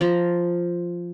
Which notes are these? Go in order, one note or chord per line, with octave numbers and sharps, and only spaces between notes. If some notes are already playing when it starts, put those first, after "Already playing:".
F3 A#5